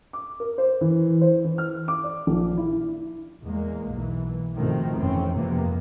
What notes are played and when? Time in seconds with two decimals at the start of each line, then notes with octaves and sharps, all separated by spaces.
0.13 D6
0.40 A#4
0.58 C5
0.81 E3
1.21 C5
1.44 E3
1.58 F6
1.88 D6
2.04 D5
2.27 A#1
2.57 E4
3.42 E2 G#3 A#3
3.91 B1 E3
4.55 G#2 B2 D#3 F3 A3 C4
4.98 F1 F2 E3 C4 C#4
5.35 F2 G#2 C3 F3 A#3 B3